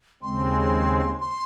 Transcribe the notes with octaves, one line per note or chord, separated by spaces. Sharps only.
D#2 C#3 G#3 C4 C6
C6